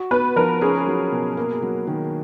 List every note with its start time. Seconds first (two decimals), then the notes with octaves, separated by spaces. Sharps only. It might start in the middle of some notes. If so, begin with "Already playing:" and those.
Already playing: F#4
0.11 B3 B4
0.36 F3 A#4
0.61 C#4 G#4
0.87 F#3
1.12 B2
1.37 A#3
1.62 F#3
1.87 D#3